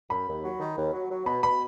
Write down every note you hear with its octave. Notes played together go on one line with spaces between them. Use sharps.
F#2 B5
D#2
F#3
D#3
D#2
F#3
F#3
B2 B5
B2 B5